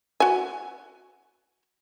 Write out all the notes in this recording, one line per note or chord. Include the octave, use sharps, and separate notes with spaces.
F#4 G#5